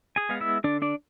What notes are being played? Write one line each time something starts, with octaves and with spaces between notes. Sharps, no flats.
G#4 G#5
G#3 B3 F5
E4 E5
D3 D4 D5
D4 D5